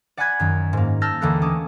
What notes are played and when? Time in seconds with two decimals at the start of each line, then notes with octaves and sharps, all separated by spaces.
0.17 D5 F#5 G#5 B5 F#6 G#6
0.40 F#2 D#3
0.73 G#2 A#3
1.02 A5 E6 F6 G6 A6 A#6
1.21 D#2 D3 E3 A#3 A4 F#6
1.42 A3 C#4 A5 D6 D#6